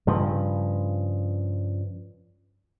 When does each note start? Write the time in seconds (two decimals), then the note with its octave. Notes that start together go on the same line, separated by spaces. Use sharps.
0.07 G2 C#3 F3